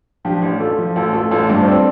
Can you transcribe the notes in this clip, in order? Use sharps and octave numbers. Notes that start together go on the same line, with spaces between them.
F3 D4 G4
A1
A3 F4 A4
F3
A1 F4 A4
A3 F4 A4
A1 F4 A4
G2 A3 D4
C5
C4 A4 D5